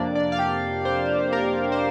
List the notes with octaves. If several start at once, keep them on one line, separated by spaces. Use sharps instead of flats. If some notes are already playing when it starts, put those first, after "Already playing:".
Already playing: F2 C3 A#3 D4 D5
D4 D5
F5
G4 G5
C5
A#4
C5